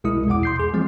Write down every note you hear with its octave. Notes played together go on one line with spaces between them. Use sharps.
C2 B2 G#3 E4 D#6
A#1 E2 B2 F#5 D6
C6 G6 C7
G#4
E3 F3 G#3 C4